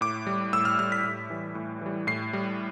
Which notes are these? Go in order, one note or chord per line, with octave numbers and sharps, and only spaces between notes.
A2 D6
G3
A2 E6
F6
G3 F6
B6
A2
E3 G3
A2
E3 G3
A2 C7
G3